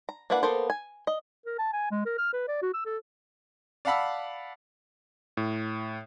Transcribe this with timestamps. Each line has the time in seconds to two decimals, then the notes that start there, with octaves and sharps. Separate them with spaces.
0.09 A#5
0.30 A#3 D4 E4 B4 F#5
0.43 A#3 B3 A4 A#4 C5
0.70 G#5
1.07 D#5
1.46 A#4
1.59 A5
1.73 G#5
1.91 G#3
2.06 A#4
2.18 F6
2.33 B4
2.48 D5
2.62 F#4
2.74 E6
2.85 A4
3.85 D5 F5 F#5 A5 B5 E6
5.37 A2